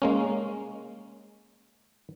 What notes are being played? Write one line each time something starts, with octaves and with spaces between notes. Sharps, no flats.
G#3 A#3 C#4